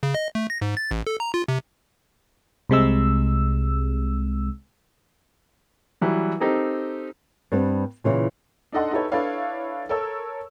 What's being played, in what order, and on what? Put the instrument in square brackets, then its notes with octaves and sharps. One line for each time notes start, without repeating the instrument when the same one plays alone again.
[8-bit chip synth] C#3
D#5
A3
A#6
G#2
A6
A1
A4
A#5
F4
C3
[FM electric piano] C2 C3 G#3 E6
[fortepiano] E3 F#3 G3
C4 D#4 G4 A4 A#4
[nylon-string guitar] G2 G3 B3 C4
A#2 C#3 E3
[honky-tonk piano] D4 D#4 A4 D#5 F#5 C6
D#4 E4 G4 A4 B4 C#5
D4 E4 A4 B4 C#5 F5
A4 A#4 C#5 E6